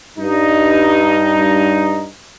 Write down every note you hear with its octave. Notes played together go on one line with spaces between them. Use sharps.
G2 D#4